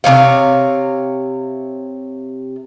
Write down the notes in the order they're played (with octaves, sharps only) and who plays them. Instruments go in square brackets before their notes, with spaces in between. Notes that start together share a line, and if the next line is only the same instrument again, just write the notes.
[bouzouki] C3 G3 C#5 F5